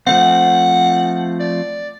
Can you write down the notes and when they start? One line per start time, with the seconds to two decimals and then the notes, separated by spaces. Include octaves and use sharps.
0.07 F3 A3 C4 F#5
1.40 D5